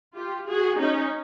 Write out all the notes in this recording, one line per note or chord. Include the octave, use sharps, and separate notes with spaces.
F4 G4
F#4 G#4
C#4 D#4